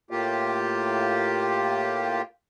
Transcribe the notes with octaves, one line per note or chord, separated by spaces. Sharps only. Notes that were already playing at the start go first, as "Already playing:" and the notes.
A2 A#3 F4 G4